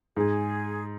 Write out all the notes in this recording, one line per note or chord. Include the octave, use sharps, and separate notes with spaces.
G#2 G#4